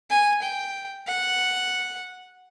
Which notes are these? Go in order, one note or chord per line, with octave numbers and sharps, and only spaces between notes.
G#5
G5
F#5